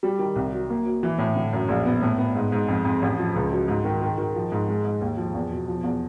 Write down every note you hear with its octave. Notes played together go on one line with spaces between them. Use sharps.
G3
D#3
C2
F#3
A#3
F#3
E3
A2
D3
F#2
A#1
B3
A2
B3
G#2
G#2
F2
F2
A1
F3
C#2
F#3
G#2
D#3
D#3
D#3
F3
G#2
G#3
G#2
D#2
F3
E2
B2
F3
E2